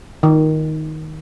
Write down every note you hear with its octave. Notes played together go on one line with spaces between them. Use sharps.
D#3